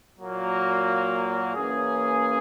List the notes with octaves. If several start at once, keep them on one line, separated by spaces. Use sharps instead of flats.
A#2 F#3 A#3
E3 A#3 C#4 G#4